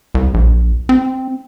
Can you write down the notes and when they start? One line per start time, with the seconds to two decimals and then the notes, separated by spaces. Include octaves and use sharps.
0.15 C2
0.34 A#1
0.89 C4